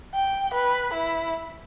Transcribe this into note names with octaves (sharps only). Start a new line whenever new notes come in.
G5
B4
E4